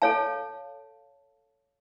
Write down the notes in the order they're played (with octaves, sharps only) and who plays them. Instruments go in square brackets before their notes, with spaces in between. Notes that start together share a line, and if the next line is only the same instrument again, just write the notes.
[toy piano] A4 C#5 F5 A5